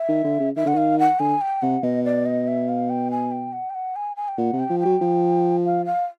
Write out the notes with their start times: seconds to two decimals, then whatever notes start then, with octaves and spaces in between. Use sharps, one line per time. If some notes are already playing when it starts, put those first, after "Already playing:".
Already playing: E5
0.09 D#3
0.24 D3
0.40 C#3
0.56 D#3 E5
0.66 D3 F#5
0.74 D#3 F5
0.99 F#5
1.20 D3 G#5
1.41 G5
1.62 C3 F#5
1.83 B2 D#5
2.05 D5
2.26 D#5
2.47 E5
2.68 F5
2.90 G5
3.11 G#5
3.31 G5
3.53 F#5
3.70 G5
3.75 F#5
3.96 G#5
4.16 G#5
4.28 G5
4.38 A#2 F#5
4.53 C3
4.59 G5
4.70 F3
4.80 G5
4.85 F#3
5.02 F3
5.65 F5
5.86 F5